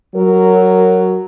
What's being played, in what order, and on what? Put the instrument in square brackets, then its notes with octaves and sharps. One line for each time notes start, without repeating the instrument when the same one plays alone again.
[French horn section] F#3 A#4